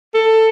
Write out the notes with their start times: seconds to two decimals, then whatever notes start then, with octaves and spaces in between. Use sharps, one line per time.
0.14 A4